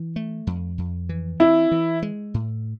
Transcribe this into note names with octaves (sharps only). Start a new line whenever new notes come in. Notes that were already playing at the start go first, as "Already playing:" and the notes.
Already playing: E3
A3
F2
F2
E3
C4 E4
E3
G#3
A2